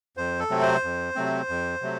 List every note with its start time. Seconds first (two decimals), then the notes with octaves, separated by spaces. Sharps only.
0.17 F2 C5
0.39 A4
0.50 C3 F#3 A3 C4
0.62 C5
0.83 F2
1.15 C3 F#3 A3 C4
1.49 F2
1.82 C3 F#3 A3